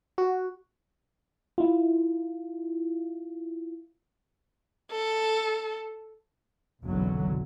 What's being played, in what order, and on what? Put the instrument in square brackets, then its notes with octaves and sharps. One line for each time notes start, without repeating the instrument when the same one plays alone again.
[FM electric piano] F#4
E4 F4
[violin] A4
[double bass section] F#1 B1 D3 E3 F#3